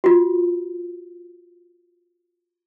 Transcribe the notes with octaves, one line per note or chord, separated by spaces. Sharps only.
F4 F#4